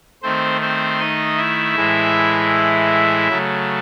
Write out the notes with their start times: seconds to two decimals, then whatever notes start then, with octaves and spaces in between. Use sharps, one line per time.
0.22 D#3 A3 C4 C5
0.61 C4 C5
0.99 D#4 D#5
1.37 E4 E5
1.76 A2 E3 G#3
3.29 C#3 F#3 A3